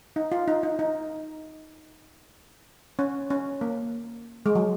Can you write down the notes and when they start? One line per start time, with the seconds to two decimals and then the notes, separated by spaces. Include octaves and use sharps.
0.16 D#4
0.32 F4
0.48 D#4
0.63 D#4
0.79 D#4
2.99 C#4
3.30 C#4
3.61 A#3
4.46 G#3
4.55 F#3